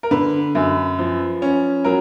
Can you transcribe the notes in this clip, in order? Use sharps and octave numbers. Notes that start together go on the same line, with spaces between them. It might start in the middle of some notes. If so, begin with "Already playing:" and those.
A#4
D3 B4
F#2
F3
C#4
F#3 A#4